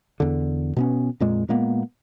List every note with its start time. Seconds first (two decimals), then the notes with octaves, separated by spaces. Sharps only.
0.20 E2 D3
0.77 B2 B3 C#4
1.20 F2 A#2 G#3
1.49 A#2 G#3 A#3 B3